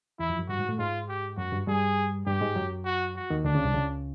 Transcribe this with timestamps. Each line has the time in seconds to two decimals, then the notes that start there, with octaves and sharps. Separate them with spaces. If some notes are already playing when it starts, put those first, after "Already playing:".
0.19 E2 E3 E4
0.29 F2 F3
0.39 F#2 F#3
0.49 G2 G3 F#4
0.59 G#2 G#3
0.68 A2 A3
0.79 G#2 G#3 F4
1.09 G4
1.37 F#2 F#3 F#4
1.52 G2 G3
1.67 G2 G3 G#4
2.26 G2 G3 G4
2.41 G#2 G#3
2.56 F#2 F#3
2.85 F#4
3.16 F#4
3.30 D#2 D#3
3.45 D2 D3 D4
3.55 C#2 C#3
3.65 C2 C3
3.74 C#2 C#3